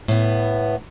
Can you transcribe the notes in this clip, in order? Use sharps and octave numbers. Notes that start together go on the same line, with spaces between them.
A2 B3